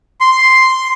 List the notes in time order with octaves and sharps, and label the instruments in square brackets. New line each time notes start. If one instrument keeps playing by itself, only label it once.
[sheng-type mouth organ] C6